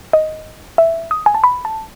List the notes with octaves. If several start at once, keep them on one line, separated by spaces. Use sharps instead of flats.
D#5
E5
D#6
G#5
A5
B5
A5